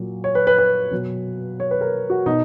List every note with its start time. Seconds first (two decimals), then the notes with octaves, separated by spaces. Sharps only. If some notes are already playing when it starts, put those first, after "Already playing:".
Already playing: A#2 F#3
0.24 C#5
0.35 B4
0.47 B4
0.58 B4
0.91 B2 F#3
1.60 C#5
1.71 B4
1.81 A#4
2.10 F#4
2.26 B2 D#4